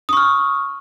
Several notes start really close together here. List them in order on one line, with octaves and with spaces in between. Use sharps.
D#6 C#6 F6